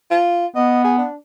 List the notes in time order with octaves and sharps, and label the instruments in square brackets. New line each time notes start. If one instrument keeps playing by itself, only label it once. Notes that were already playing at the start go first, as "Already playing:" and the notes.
[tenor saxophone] F4
[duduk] B3 [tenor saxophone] D#5
[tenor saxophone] G#4
D4